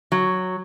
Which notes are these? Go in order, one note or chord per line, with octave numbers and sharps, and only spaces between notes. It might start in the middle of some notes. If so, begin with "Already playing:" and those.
F#3